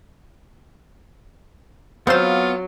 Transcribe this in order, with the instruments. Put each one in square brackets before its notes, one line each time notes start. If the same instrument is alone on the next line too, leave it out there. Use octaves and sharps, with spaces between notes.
[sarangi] F#3 [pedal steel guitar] B3 F5 F6 [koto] C4 C5 [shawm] F4